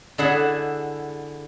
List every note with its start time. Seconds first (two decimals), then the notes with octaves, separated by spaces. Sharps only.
0.18 D3 E4 G#4 E5 F#5